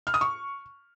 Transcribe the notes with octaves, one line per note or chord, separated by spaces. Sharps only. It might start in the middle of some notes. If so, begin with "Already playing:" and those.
F6
D#6
C#6